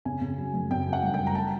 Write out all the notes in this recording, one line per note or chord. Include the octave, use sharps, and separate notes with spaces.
C#3 G#5
C#3
F#3
F#2
C#3 G5
F#3
F#5
G1
G5
G1
A#5
A5